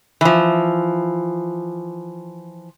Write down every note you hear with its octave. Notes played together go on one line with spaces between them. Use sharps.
E3 F3